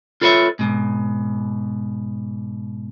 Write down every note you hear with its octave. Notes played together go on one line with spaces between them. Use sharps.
F4 A4 B4 C#5 D#5 E5
G#2 B2